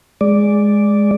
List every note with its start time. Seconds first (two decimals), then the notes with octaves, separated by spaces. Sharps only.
0.21 G#3 D5